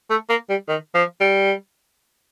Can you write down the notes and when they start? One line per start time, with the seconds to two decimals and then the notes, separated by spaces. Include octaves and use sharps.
0.10 A3
0.29 A#3
0.50 G3
0.68 D#3
0.95 F3
1.20 G3